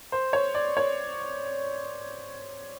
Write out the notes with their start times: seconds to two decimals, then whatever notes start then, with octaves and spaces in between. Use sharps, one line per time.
0.12 C5
0.33 C#5
0.55 D5
0.77 C#5